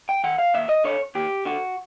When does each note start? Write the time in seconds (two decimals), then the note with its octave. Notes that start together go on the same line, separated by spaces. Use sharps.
0.09 G5
0.24 D#3 F#5
0.38 F5
0.54 D#2 E5
0.69 D#5
0.84 D3 C#5
1.15 D#2 G4
1.45 D3 F#4